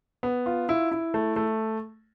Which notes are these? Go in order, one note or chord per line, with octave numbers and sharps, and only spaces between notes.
B3
F4
E4
E4
A3
A3